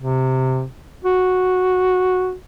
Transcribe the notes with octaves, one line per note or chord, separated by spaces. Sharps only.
C3
F#4